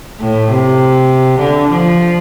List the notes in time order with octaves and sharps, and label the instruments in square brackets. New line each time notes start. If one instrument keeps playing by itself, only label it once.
[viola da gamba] A2
C3
D3
F3